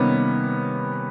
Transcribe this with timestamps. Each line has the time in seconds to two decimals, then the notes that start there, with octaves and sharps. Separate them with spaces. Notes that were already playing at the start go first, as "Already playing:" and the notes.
Already playing: C3 D#3 G3 A#3 B3 C#4